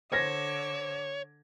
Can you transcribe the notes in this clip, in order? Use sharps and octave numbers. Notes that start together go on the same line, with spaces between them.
D3 C5 C#5 D6 E6 G#6 A#6